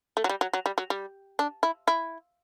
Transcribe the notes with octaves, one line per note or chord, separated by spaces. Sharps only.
A3
F#3
G3
F#3
F#3
G3
F#3
G3
D4
E4
E4